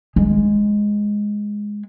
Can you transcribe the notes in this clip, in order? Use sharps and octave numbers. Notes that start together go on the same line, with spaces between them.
G#3